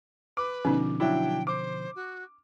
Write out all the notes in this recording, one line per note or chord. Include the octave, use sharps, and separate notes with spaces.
B4 D6
B2 D3 F3 C#4 D#4
F#3 D4 E4 G5
C5 D6
F#4